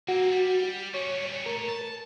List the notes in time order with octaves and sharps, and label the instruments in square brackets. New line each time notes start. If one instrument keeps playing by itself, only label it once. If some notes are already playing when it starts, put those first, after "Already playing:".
[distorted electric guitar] A#3 C4 [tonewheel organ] F#4
[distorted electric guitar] G3
[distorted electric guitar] G3 C#4 [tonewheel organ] C#5
[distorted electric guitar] A3 C#5 [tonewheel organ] A#4
[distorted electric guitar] A5